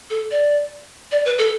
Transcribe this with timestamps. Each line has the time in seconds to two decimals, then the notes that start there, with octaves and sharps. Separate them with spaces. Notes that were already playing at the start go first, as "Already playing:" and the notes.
0.10 A4
0.31 D5
1.12 D5
1.25 B4
1.38 A4